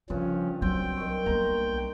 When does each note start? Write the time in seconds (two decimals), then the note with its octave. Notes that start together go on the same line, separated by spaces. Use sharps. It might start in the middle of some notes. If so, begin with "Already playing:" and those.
0.10 G2 C#3 F3 C#4
0.62 B1 F#3 C4 G5
0.97 D#3 C#6
1.26 A#3 B3 A#5 C6